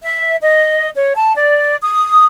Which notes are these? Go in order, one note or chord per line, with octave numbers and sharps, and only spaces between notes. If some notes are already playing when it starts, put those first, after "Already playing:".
E5
D#5
C#5
A5
D5
D#6